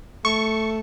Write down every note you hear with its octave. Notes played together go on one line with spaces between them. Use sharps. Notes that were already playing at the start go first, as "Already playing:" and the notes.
A3 C#6